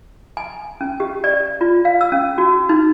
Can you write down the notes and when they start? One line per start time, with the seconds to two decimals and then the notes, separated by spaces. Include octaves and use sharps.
0.37 G#5
0.81 C#4
1.00 G4
1.24 D5
1.61 F4
1.85 F5
2.01 E6
2.12 C#4
2.38 F#4
2.69 D#4